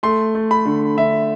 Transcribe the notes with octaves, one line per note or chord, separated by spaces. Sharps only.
A3 C6
A3
B5
D3
D3 E5